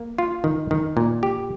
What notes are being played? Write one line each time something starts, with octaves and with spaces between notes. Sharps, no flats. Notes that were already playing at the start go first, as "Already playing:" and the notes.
Already playing: A#3
F4
D#3
D#3
A#2
G4